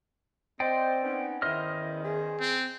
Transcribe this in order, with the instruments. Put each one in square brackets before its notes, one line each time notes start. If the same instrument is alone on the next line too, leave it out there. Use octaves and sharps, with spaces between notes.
[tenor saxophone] C4 [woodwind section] C5 D#5 [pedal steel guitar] D5 G5
[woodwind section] B3 C#4 D#4
[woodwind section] E2 D#3 C#4 [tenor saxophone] E4 [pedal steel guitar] C5 D#5 F6
[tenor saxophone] G#4
[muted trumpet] C4